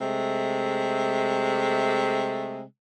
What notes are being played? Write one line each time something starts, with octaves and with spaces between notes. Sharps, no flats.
C3 G#3 A3